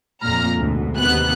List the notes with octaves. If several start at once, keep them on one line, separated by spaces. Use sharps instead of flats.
F2 A#2 A#5 F6
D2 G#2 B2
D#2 C3 B3 F#6